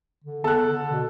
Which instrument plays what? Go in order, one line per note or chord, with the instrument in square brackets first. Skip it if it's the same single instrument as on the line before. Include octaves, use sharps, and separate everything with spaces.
[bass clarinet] D3
[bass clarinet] B3 [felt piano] A4 F#6
[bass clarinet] D3
B2